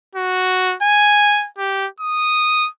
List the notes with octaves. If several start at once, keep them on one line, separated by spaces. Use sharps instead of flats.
F#4
G#5
G4
D#6